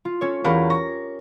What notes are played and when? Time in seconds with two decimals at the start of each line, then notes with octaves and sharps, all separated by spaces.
0.05 F4
0.21 C#4 A4 C#5
0.44 E2 C#4 G4 A#4 F5 B5
0.70 C#6 A#6